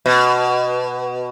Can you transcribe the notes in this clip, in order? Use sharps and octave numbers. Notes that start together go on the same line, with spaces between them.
B2